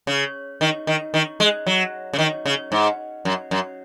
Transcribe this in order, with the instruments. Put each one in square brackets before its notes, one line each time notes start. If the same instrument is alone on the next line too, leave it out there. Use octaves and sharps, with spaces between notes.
[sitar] C#3
D#3
D#3
D#3
G#3
F#3
C#3
D#3
C#3
G#2
F#2
F#2